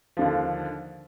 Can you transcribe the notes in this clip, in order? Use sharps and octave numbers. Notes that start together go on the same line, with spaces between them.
D#2 D3 F3